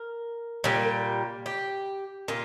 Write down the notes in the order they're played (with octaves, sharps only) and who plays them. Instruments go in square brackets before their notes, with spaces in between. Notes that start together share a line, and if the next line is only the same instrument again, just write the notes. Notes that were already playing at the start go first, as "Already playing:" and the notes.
Already playing: [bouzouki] A#4
A#2 G3
G4
A#2 F4